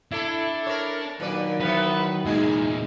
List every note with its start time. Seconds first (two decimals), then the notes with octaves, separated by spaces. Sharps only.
0.12 D4 E4 A4
0.67 A#4 C#5
1.20 A#2 D#3 F#3 B4 D5
1.61 E3 B3 C4 B4
2.25 E2 A#2 G#3 D#4 E4 G#4